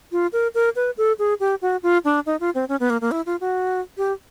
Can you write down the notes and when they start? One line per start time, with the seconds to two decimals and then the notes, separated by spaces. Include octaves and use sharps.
0.12 F4
0.33 A#4
0.55 A#4
0.76 B4
0.97 A4
1.19 G#4
1.40 G4
1.62 F#4
1.83 F4
2.05 D4
2.26 D#4
2.40 F4
2.55 C4
2.69 C#4
2.80 B3
2.90 A#3
3.01 A#3
3.11 E4
3.26 F4
3.41 F#4
3.97 G4